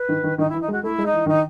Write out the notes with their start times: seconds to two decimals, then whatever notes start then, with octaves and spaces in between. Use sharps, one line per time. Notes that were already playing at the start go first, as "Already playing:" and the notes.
Already playing: B4
0.09 D#3
0.24 D#3
0.38 D#3 D#4
0.49 E3 E4
0.61 D#4
0.68 G#3
0.72 F#4
0.83 A3 E4
0.98 G#3
1.05 D#4
1.13 E3
1.26 D#3 D#4